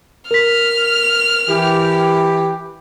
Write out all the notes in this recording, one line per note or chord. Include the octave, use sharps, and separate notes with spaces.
A#4 F6 B6
E3 G4